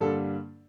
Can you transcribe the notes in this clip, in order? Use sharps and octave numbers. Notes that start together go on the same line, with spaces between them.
G2 D3 G3 A#3 D4 A4